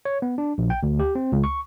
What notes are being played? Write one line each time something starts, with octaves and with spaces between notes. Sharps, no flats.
C#5
B3
D4
A#1
G5
D2
G4
C4
C#2
C#6